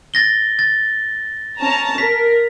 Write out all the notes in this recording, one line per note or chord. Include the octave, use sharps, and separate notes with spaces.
A6 A#6 G7
A6
C#4 A5 A#5
A#4 B6